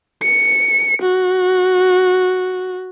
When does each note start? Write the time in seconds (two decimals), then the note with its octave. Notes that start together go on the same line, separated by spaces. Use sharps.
0.23 C#7
1.02 F#4